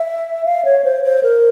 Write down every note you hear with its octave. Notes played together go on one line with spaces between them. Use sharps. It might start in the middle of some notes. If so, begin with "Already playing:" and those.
Already playing: E5
F5
C#5
C5
C5
A#4